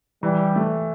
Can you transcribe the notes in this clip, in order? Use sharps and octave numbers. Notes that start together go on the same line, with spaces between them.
E3 G3
A3